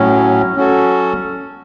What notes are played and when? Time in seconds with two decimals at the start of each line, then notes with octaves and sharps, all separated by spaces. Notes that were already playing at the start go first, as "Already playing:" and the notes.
Already playing: A2 F#3 C#4
0.56 F#3 C#4 F#4 A4